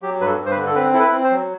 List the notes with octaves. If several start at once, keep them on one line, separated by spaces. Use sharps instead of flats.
F#3 G4
G2 B4
A4
G2
C5
B4
D3
A4
C4 B4
E4 A4
B4
C4
C5
F#3